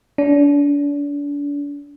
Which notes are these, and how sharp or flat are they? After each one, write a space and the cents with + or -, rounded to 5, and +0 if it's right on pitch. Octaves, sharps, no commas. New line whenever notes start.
D4 -35